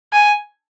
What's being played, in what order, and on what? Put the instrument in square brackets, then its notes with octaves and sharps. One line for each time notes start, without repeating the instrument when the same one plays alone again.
[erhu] G#5